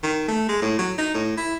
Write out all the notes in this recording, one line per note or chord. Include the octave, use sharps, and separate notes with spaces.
D#3
A3
G#3
A2
F#3
D#4
A2
E4